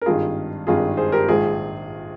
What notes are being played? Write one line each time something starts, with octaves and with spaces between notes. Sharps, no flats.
A#4
G#1 G2 D#3 F4 G#4
G#1 G2 D#3 F4 G#4
G#4 C5
G4 A#4
A#1 G#2 D#3 F4 G#4